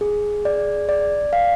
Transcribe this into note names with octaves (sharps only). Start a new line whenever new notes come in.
G#4
D5
D5
F5